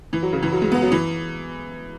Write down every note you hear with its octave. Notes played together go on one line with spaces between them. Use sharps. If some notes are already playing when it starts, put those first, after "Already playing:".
E3
F#3
C#3
E3
F#3
G#3
B3
F#3
E3